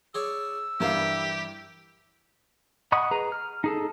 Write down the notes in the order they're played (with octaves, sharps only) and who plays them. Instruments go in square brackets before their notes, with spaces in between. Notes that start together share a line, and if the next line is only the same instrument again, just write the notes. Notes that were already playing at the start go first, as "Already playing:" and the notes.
[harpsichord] G#4 C#5 D5 [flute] E6
[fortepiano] G2 A#4 F5 [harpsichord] E3 G3 A5 [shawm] G4
[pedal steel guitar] D#5 F#5 B5 C#6 D#6
G#4 B4 A#5
F6
D#4 G#4 A4